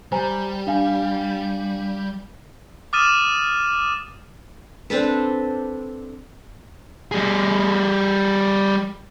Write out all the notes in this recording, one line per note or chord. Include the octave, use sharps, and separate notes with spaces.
G3 C5 G#5 A#5
D4 F5 G#5
D6 D#6 F6 A6 D#7 E7
C4 D4 A4 B4
G3 G#4